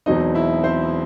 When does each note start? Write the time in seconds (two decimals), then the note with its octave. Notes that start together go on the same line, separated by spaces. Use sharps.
0.06 E1 E2 B2 F#3 C4 D#4 D#5
0.35 E4 E5
0.64 C4 C5